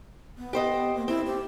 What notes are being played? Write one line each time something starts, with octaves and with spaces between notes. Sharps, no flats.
B3
G4 C5 D#5
A#3
C4 E4
G4